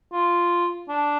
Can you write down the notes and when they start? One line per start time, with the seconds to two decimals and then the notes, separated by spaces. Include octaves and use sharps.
0.13 F4
0.89 D4